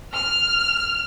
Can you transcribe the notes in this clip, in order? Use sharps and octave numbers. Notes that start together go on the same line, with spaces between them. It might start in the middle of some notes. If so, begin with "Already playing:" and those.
F6